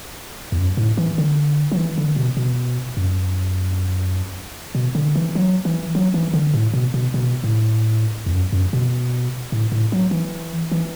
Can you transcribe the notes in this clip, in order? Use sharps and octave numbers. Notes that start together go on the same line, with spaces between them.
E2
F#2
A2
E3
D3
F#3
E3
D3
B2
B2
F#2
B2
D3
E3
F#3
E3
F#3
E3
D3
A2
B2
B2
B2
A2
E2
F#2
F#2
B2
A2
A2
F#3
E3
E3